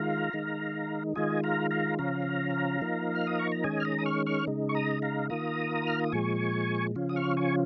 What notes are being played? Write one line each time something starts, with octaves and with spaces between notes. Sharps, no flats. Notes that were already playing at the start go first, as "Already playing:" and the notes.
Already playing: D#3 G#3 F4 F5 A#5
D#3 G#3 D#4
D#3 G#3 F4 D#5 G#5
F5 A#5
F5 A#5
C#3 F3 C#4 F5 A#5
F3 A#3 D#4
F6
D#6
C#6
A#5
D#3 G#3 C#4 D#5 G#5
F6
A#5 D#6
D#6
C#6 F6
C#6 F6
C#3 G#3 D#4
C#6
A#5 D#6
F5 A#5
D#3 A#3 F4 A#5 D#6
F6
D#6
A#2 F3 G#3 G#5 C#6
C#3 F3 C#4 F4
D#6
C#6 F6
G#5 C#6